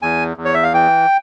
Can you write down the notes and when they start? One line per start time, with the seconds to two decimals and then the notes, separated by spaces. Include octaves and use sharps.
0.02 E2 G#5
0.37 E2
0.45 C#5
0.54 E5
0.63 F5
0.73 E3 G5